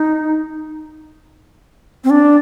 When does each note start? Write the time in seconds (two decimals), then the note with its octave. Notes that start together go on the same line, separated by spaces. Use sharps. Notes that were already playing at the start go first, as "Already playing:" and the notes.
Already playing: D#4
2.04 C4
2.10 D4